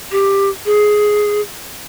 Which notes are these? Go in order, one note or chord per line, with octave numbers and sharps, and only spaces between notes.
G4
G#4